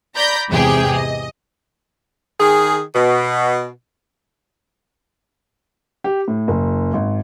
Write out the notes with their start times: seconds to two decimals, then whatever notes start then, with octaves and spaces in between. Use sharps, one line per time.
0.15 D5 A#5 B5 G6 A#6
0.49 E2 G#2 C3 G4 G#4 G5
0.95 D#5
2.40 D#3 G#4
2.95 B2
6.04 G4
6.28 A2
6.48 F#1
6.93 G#1